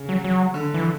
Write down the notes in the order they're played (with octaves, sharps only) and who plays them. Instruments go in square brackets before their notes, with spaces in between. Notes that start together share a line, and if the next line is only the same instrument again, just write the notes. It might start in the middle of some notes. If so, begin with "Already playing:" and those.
Already playing: [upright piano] C#3
[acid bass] F#3
F#3
[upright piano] D3
[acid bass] E3